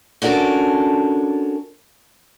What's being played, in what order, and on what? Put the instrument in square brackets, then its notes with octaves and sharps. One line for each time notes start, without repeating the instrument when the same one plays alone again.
[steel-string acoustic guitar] C#4 D4 F#4 A4 A#4